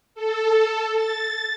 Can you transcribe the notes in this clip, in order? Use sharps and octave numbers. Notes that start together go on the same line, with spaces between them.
A4
A6